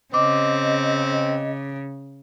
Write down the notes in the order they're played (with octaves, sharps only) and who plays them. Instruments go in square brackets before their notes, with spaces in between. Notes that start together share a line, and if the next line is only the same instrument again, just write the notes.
[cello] C#3 [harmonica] C4 [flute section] D#5 [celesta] D6